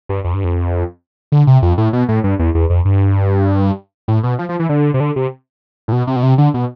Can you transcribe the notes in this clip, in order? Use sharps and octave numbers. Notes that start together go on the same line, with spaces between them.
G2
F2
G2
F2
D3
C3
F2
A2
B2
A2
G2
E2
E2
F2
G2
A2
B2
F3
F3
E3
D3
C3
D3
C3
A2
B2
C3
B2
C3
D3
B2